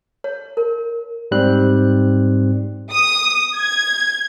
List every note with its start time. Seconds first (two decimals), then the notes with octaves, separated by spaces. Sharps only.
0.24 C#5
0.57 A#4
1.31 G#2 G3 C4 F#6
2.90 D#6
3.57 G#6